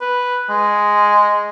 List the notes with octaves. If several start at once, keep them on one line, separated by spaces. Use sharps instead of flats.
B4
G#3